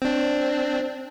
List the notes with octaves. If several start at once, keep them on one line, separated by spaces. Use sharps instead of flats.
C4 D4